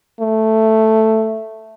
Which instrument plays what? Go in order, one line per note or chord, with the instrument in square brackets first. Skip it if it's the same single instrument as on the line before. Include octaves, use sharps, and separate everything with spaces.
[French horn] A3